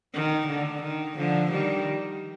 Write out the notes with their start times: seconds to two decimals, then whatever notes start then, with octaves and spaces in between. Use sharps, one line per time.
0.14 D#3
0.48 D3
0.82 D#3
1.16 D3 F3
1.51 D#3 G3